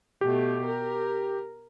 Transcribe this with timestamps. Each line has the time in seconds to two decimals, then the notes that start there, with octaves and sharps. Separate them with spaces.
0.21 B2 A3 G4
0.66 A#4